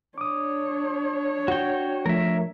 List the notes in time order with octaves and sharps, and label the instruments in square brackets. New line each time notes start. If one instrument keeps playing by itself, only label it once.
[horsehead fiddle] D4 C#5 [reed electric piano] D6 D#6
[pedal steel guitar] F#4 G5
[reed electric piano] F3 A3 [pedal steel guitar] A#4 E5